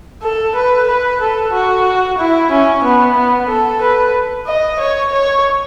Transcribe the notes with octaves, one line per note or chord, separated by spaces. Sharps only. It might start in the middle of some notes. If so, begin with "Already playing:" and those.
A4
B4
B4
A4
F#4
E4
C#4
B3
B3
A4
B4
D#5
C#5
C#5